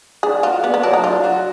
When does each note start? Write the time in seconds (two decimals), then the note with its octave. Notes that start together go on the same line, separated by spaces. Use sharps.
0.23 D4 G#4
0.43 F4 F#4
0.63 B3 D5
0.74 B3
0.83 F#3 D4
0.93 D#4
1.04 D4 F4
1.24 F#4